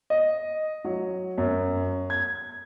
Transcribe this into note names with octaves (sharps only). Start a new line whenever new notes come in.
D#5
F#3
F#2
G#6